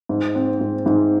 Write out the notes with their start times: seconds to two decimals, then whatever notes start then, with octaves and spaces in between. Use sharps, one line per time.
0.09 G#2
0.35 C4
0.61 G#2
0.86 G#2